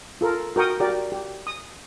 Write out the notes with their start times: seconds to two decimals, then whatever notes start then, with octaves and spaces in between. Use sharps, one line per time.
0.21 F4 A4 A#4
0.56 F#4 A#4 G5 C#6 D#6
0.80 F#4 G4 A#4 D5
1.12 G4
1.47 D#6